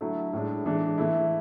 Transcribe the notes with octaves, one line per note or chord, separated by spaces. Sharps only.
D3 F#3 A3 E4
A2 G#3 D4
E3 G#3 D4
E3 A3 E4